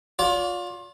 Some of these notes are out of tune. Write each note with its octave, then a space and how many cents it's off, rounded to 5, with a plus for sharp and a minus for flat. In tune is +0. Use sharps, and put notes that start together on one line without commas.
F4 +30 D5 -35